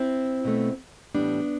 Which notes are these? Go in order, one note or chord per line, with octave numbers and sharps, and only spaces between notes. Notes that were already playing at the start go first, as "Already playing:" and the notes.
Already playing: C4 E4
B2 A3
A2 E3 G3 B3 D4